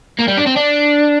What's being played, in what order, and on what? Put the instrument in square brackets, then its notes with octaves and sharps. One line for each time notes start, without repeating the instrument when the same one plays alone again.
[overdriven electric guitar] A#3
G3
D4
C4
D4